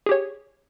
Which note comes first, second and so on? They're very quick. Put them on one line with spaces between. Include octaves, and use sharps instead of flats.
G#4 G4 C#5